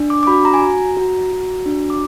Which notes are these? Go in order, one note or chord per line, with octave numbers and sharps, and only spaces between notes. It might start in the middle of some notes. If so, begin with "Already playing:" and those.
Already playing: D4
D6
D6
F#4 B5
A#5
G#5
F#4 A#5
F#4
F#4
D4
D6